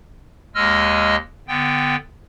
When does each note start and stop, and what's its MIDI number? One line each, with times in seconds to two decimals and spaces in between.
0.55 1.16 39
0.55 1.16 56
0.55 1.16 75
0.55 1.16 88
0.55 1.16 89
1.48 1.96 50
1.48 1.96 59
1.48 1.96 79